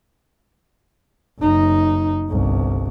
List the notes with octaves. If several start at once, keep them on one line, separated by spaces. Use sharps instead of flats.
F#1 D#4
G1 C2